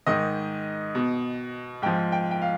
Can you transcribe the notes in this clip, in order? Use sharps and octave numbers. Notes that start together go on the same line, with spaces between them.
G#2 D#3 D#5
B2
G#2 F3 G5
G5
G5
F5